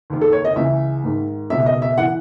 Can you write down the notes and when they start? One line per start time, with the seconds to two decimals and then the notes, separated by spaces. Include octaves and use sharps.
0.10 D#2 D#3
0.21 A4
0.33 C#5
0.45 D#5
0.56 C#2 C#3 E3 E5
1.04 G#2 D#3
1.50 C#2 B2 E5
1.66 D#5
1.82 E5
1.98 E3 F#5